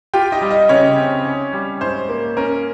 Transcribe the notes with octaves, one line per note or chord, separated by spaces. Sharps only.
F4 G4 G5
D#4 D#5
G3
D#4 D#5
C#3 C#4 C#5
C4
C#4
G3
G#2 C5
A#3
C#4 A#4